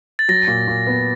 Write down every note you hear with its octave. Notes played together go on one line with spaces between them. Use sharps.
A6
F#3 A#6
A#2
A#2
B3